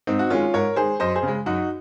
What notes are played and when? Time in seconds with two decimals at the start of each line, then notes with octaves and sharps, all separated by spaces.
0.07 G#2 C4 D#4
0.19 F#4
0.30 D#3 G#3 C#4 F4
0.53 G#2 A#4 C#5
0.76 D#3 G#3 G#4 C5
1.00 F#2 C5 D#5
1.15 G#4 C5
1.23 C#3 G#3
1.46 F#2 D#4 F#4